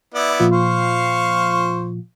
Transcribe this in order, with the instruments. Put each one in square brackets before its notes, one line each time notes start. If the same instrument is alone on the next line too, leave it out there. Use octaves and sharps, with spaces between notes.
[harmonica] B3 E4 D5
[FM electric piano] A#2 F3 F4
[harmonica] C5 F5 C#6